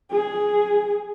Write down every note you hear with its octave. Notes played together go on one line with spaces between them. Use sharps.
G#4